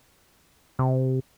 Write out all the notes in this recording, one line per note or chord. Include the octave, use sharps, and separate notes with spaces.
C3